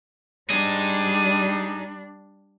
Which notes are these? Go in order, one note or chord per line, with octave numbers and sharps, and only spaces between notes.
G3 D4 D#4 G#4